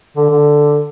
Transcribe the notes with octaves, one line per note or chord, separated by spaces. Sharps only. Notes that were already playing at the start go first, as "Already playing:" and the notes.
D3
D3